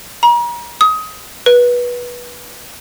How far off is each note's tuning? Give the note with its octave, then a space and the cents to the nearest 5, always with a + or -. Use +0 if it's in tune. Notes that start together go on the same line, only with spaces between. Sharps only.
A#5 +40
D#6 +25
B4 -20